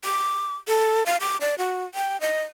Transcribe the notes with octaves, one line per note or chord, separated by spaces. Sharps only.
D6
A4
F5
D6
D5
F#4
G5
D#5